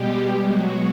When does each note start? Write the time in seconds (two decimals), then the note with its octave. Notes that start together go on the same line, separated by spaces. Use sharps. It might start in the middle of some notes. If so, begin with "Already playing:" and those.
Already playing: B2 G3 G#3 G4
0.48 B2 F#3 G#3 F#4